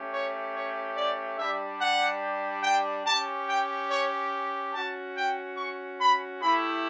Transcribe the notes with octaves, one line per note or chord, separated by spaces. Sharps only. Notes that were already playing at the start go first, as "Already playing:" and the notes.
Already playing: A3 C#4 G4
C#5
C#5
D5
G3 D4 G4 E5
F#5
G5
G4 A5
C#4
G5
C#5
C#4 F#4 A5
G5
C#6
B5
A3 E4 G4 B5